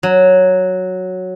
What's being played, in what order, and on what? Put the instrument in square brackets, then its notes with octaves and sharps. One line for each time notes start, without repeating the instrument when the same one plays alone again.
[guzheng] F#3